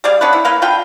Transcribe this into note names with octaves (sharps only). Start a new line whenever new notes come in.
G3 G#4 D5 F5
B3 C#4 D4 B4
E4
A#3 B4 F5
D3 F4 B4 G5